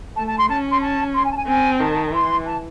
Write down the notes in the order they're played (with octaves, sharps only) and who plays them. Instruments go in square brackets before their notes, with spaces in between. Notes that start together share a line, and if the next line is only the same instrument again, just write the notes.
[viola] A3 [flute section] A5
[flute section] A5
C6
[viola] C#4 [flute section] A5
[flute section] C6
A5
C6
G#5
A5
G#5
[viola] C4 [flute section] G#5
[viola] D#3 [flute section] A5
[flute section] A5
[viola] E3 [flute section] C6
[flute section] A5